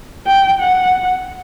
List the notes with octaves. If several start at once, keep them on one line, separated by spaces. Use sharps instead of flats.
G5
F#5